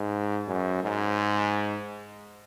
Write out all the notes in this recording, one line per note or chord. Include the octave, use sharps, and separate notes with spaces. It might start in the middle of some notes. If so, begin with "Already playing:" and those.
Already playing: G#2
F#2
G#2